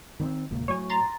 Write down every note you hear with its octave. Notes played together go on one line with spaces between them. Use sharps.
D#3 B3 C4
E1 C#2 A#2
A2 F#3 C#5 G#5
A#5 C6 A6